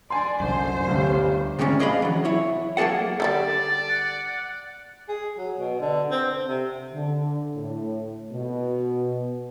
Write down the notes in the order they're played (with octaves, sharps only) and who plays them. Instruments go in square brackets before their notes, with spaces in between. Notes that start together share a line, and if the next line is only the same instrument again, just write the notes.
[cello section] D4 D5 [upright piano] G#5 C6
[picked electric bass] C2 F#2 [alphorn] D3 [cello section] C5
[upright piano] G1 G2 [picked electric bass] D2 [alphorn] G3
[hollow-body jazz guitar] D2 G#2 C3 G3 C#4
D4 G#4 D#5 F5 G5 B5
E3 F#3
E4 C#5
F#3 A#3 G#4 A4 F#5
[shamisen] D3 F#3 G3 [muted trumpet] D5 [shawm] A5
[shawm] F#5
[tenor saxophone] G#4
F#3
B2
D3
C4
C4
C3
[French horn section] D3
A2
B2